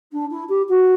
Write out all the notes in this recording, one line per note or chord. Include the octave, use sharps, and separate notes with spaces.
D4
E4
G4
F#4